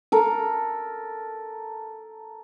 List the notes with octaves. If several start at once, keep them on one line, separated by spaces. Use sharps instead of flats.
A4 A#4